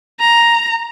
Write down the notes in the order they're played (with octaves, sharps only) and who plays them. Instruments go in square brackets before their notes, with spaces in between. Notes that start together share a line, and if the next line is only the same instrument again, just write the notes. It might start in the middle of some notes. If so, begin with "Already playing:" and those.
[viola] A#5